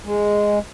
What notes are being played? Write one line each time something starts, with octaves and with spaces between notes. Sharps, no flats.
G#3